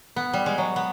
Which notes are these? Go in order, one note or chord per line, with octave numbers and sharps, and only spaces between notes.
B3
G3
G#3
F#3
B3